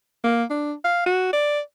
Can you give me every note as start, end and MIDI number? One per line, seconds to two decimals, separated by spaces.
0.24 0.43 58
0.50 0.73 62
0.84 1.02 77
1.06 1.28 66
1.33 1.59 74